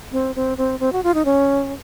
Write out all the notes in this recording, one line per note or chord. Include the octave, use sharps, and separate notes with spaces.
C4
C4
C4
C4
F#4
F4
D#4
C#4